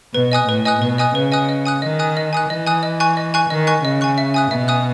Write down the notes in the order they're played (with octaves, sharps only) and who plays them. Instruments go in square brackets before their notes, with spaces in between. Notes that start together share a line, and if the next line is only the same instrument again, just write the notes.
[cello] B2 [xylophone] B4
[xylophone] D#5 G#5 D#6 F#6
[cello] A2 [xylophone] B4
[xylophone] D#5 G#5 D#6 F#6
[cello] B2 [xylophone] B4
[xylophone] D#5 G#5 D#6 F#6
[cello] C#3 [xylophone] B4
[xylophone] D#5 G#5 D#6 F#6
D#5
G#5 D#6 F#6
[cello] D#3 [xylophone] D#5
[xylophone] G#5 D#6 F#6
D#5
G#5 D#6 F#6
[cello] E3 [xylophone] D#5
[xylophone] G#5 D#6 F#6
D#5
G#5 C#6 F#6
D#5
G#5 C#6 F#6
[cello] D#3 [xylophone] D#5
[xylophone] G#5 C#6 F#6
[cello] C#3 [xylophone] D#5
[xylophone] G#5 C#6 F#6
E5
G#5 D#6 F#6
[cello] B2 [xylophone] E5
[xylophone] G#5 D#6 F#6